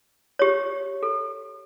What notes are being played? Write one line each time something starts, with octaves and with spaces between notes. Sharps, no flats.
G4 C#5
A4